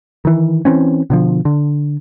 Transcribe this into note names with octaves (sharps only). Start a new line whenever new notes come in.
D#3 E3
E3 C4 C#4
B2 D3 F3
D3